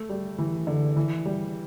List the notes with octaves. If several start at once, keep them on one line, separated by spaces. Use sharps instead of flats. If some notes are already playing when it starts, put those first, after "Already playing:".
Already playing: A3
G3
E3
D3
E3
G3